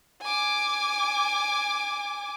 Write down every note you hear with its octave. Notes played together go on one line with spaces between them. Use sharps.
G#5 D6